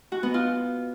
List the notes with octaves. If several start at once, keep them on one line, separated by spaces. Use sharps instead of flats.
F#4
B3
F4